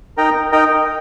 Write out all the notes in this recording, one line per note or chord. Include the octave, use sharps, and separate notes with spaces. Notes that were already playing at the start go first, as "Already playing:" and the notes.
D#4 A#4 D#5 G5
D#4 A#4 D#5 G5